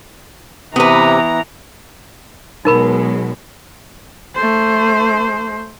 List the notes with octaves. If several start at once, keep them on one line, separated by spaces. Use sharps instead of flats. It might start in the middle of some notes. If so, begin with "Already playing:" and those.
C3 E3 B3 B4 A#5
B2 F#3 G#3 D#4 A#4 B5
A3 C5